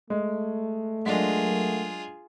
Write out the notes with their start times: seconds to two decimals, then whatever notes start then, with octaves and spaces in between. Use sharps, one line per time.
0.10 G#3 A3
1.06 F#3 G#3 D4 F4 G#4 A#4